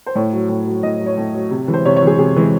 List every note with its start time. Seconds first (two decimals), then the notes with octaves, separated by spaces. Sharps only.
0.06 C5
0.15 A2 C#5
0.33 F#3
0.49 A2
0.67 F#3
0.83 A2 D#5
1.01 F#3
1.06 C#5
1.17 A2
1.34 F#3
1.51 C3
1.68 E3 G#3
1.73 C5
1.85 C3 C#5
1.96 C#5
2.02 E3 G#3 G#4
2.19 C3 G#4
2.36 E3 G#3